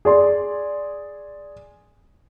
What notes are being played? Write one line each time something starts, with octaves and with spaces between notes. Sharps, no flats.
G#4 D5 C6